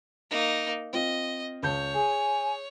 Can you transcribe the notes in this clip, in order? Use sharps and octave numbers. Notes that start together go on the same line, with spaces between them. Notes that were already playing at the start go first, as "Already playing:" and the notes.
A#3 D#4
C4 F4 D#5
C#2 C#5 A5 G6
G#4 G#5